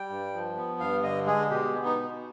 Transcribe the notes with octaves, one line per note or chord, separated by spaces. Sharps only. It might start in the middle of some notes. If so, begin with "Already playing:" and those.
Already playing: G3 G5
G2
F3
B3
G2 F5
D3 D#5
G#3 G#4
B2 G4
B3
D#4
B2